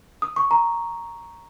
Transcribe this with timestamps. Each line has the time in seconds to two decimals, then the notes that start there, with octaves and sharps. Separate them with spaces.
0.22 D#6
0.36 C#6
0.51 A#5